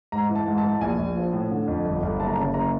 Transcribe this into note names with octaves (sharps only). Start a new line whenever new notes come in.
G#2 A#5
E3
A5
G#2
A5
E3
A5
A#1 G#5
A#1
F3
A2
D3
F2
G1
G1
F#1 A5
A#5
C#3 A5
F#1 A#5